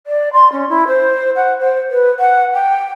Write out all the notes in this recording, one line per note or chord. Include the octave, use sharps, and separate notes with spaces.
D5
C6
C#4
E4
C5
F#5
C5
B4
F#5
G5